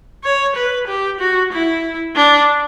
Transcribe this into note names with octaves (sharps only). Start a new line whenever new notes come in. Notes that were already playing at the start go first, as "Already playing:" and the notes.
C#5
B4
G4
F#4
E4
D4